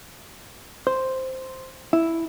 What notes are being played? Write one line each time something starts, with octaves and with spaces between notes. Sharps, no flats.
C5
E4